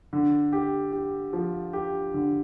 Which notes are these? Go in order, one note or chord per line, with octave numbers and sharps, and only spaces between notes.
D3
G4
G4
F3
G4
D3